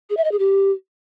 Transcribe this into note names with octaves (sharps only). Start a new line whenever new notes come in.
G#4
E5
D#5
G#4
G4